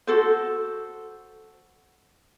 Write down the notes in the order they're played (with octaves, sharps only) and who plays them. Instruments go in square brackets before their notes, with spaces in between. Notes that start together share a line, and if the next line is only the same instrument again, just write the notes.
[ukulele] F#4 A4 C5